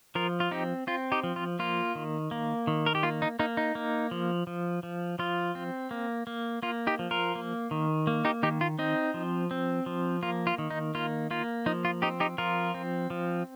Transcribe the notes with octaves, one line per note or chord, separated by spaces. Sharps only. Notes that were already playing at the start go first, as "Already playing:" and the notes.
F3 F4 A#4
F4
C4 D#4 G4
C4 F4
D#4 G4
F3
F4
A#3 F4
D#3
A#3
D#3
A#4
G4
A#3 F4
D#4
A#3 D#4
D#4
A#3
F3
F3
F3
F3 F4
C4
A#3
A#3
A#3 F4
D#4 G4
F3
F4 A#4
A#3
D#3
A#3
D#4 G4
D#3 D#4 G4
F4
C4 D#4
F3
C4
F3
A#3 F4
F4
D#3
D#4
A#3 F4
A#3 F4
F3 D#4
F4
C4 D#4 G4
D#4 G4
F3 F4 A#4
C4
F3